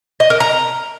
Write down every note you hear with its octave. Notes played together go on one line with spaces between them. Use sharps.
D#5
A#4
A#5